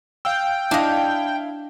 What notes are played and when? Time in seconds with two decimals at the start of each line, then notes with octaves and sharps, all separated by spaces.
0.25 F5 G5 E6
0.71 D4 E4 D#5 F5